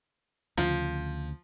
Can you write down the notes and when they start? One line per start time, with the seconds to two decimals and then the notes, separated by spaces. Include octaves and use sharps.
0.58 D2 C#3 F3